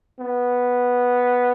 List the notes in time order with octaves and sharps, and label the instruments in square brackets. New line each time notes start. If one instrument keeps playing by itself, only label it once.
[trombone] B3